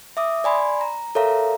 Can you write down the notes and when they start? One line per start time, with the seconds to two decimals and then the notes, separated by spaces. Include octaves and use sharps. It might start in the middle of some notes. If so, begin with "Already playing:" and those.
0.17 E5 D6 D#6
0.44 D5 G#5 B5 C6
0.81 A#5
1.15 A4 A#4 C#5 E5 F5 A#5